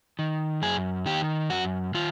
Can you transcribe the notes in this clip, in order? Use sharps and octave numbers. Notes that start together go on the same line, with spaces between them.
D#3
F#2 G#4
D#3 G4
F#2 F#4
D#3 F4